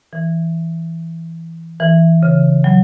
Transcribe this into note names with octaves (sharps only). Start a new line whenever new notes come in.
E3
E3
C#3
F#3